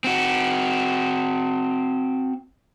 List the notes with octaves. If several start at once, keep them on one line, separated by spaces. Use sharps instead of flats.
C4 F#4